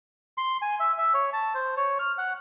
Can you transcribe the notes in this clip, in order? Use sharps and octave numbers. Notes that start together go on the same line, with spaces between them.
C6
G#5
E5
E5
C#5
A5
C5
C#5
F6
F#5